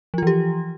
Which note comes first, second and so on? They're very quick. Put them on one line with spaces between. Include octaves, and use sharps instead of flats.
F3 F4 E3 G4